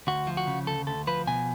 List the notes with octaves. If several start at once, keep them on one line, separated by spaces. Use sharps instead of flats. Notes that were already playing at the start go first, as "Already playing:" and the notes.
D2 F#4
F3
F#4
C#3
D2 A4
D2 A4
F3 B4
B2 G#5